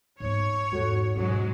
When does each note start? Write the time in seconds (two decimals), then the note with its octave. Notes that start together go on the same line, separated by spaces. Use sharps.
0.20 G#2 B3 C#5
0.72 E2 G#2 G#3 F#4 A4
1.16 G#2 B2 E3 F#3 G#3 C#4 F#4 C#5